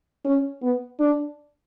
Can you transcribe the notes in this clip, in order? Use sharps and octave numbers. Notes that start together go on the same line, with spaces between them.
C#4
B3
D4